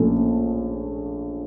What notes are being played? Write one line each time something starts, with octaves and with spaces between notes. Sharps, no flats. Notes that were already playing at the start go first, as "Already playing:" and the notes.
Already playing: A#1 A#2 A3 C#4 A4